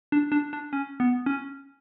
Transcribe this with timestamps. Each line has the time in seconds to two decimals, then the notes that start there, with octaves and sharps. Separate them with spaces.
0.12 D4
0.32 D4
0.53 D4
0.73 C#4
1.00 B3
1.26 C#4